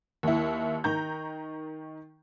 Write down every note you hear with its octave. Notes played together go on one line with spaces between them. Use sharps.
D#2 E4
D#3 A#5 G6